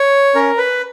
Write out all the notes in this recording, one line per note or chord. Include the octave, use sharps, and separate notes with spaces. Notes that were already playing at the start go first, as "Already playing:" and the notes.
Already playing: C#5
C#4 A#4
B4